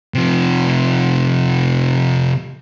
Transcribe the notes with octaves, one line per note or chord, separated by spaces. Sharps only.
C3 F3